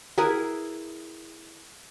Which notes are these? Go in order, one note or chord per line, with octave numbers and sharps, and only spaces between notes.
E4 G#4 A#4 B4